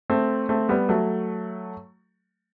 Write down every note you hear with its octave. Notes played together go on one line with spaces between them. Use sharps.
A3 C4
A3 C4
G3 B3
F#3 A3